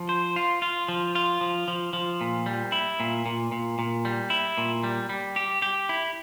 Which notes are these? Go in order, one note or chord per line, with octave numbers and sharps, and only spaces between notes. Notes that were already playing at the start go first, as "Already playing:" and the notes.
Already playing: F3
C5
F4
F4
F3
F4
F3
F3
F3
A#2
G3
E4
A#2
A#2
A#2
A#2
G3
E4
A#2
G3
G3
G4
G4
E4